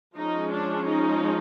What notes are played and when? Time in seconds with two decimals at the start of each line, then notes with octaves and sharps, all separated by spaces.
0.16 F3 G#3 C#4 D#4
0.52 D4
0.88 D#4